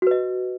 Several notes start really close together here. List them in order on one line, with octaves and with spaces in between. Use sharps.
F#4 B4 D#5